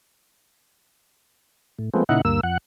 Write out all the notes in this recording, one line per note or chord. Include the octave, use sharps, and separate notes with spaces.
A2
F3 G#3 A3 B3 C4
A#2 C#3 D#4 E4 F#5
D2 G2 A#3 E6
F2 F#5